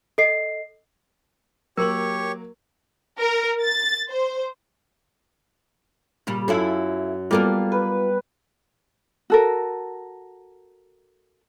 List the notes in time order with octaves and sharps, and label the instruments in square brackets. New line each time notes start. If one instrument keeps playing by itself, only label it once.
[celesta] A4 D#5 C7
[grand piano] F#3 A#3 [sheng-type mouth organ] G4 C#5 C#6 [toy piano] A#4 C6
[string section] A#4
A6
C5
[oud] A#2 C#3 G3
[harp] F#2 [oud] E4 F4 A4
[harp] G3 B3 [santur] A#3 [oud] F4 A4 A#4
[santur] B4
[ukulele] F#4 A4 A#4